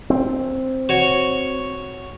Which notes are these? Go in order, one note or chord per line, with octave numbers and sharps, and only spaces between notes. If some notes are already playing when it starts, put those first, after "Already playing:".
C4
F#4 C#5